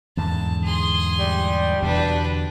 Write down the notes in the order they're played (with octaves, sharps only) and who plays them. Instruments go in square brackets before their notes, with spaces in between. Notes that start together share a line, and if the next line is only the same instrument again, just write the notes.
[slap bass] E2 G#2 D3 [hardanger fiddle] A5
[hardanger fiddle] G#4 C6
[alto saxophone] G3
[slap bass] E2 B2 D3 [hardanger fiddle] D4 B4